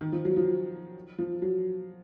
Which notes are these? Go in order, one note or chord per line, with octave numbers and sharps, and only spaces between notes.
D#3
F3
F#3
F3
F3
F#3